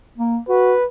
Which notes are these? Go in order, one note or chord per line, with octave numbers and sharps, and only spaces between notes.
A#3
F#4 B4